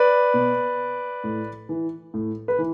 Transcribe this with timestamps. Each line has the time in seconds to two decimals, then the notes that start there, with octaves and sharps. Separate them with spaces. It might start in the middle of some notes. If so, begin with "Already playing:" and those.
Already playing: B4 D5
0.34 B2
1.24 A2
1.69 E3
2.14 A2
2.48 B4
2.58 E3